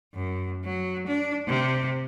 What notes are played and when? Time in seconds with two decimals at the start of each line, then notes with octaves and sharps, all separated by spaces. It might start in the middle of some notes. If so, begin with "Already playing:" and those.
0.14 F#2
0.65 F#3
1.07 D4
1.47 C3